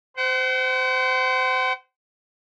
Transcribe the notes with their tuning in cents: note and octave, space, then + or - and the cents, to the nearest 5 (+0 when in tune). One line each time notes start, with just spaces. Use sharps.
C5 -20 F#5 +45